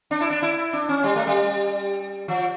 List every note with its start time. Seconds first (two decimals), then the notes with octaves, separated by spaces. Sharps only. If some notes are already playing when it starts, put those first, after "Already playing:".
0.11 D4
0.21 E4
0.30 D4
0.42 E4
0.73 D4
0.89 C#4
1.04 G3
1.16 A3
1.27 G3
2.28 F3